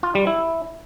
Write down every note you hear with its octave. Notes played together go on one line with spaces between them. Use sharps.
F4
G3
E4